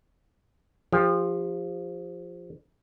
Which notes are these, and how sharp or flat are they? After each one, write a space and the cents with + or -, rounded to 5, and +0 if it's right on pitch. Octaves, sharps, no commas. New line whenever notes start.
F3 +0 G4 +35